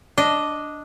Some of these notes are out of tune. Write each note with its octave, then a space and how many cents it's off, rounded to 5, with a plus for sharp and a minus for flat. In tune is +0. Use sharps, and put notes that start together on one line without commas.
D4 +0 D#5 +0